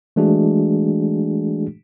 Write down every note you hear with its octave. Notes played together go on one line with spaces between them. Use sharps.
E3 G#3 A3 D4 F#4 G#4